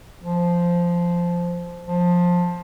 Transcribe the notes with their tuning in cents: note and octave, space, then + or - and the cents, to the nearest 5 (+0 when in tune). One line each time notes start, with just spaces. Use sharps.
F3 -10
F3 +15